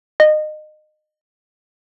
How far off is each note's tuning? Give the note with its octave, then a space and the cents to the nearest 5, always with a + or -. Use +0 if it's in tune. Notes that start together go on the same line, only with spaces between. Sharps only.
D#5 -25